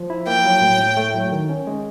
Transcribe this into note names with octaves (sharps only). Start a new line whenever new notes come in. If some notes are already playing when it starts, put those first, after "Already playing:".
Already playing: F3
E4
A#3 G5
F#3
A2
A2
A3
F#3
D#3
C#4
G#3